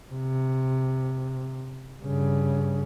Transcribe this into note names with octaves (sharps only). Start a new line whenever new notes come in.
C3
G2 C#3